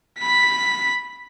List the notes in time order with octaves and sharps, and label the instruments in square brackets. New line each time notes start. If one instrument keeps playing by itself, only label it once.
[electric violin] B5 B6